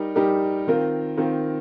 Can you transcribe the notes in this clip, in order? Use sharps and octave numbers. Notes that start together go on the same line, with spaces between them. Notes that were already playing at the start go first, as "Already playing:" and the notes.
Already playing: G3 D#4 G4 A#4
G3 D#4 G4 A#4
D#3 C4 F4 A#4
D#3 C4 F4 A#4